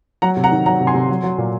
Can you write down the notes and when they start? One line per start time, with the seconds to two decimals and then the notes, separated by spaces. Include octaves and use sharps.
0.22 F#3 F#5 A#5
0.37 C3
0.44 F#5 A#5
0.52 D#3
0.66 F#3 F#5 A#5
0.80 C3
0.87 G#5 C6
0.94 C3
1.09 F#3
1.23 F#3
1.38 A#2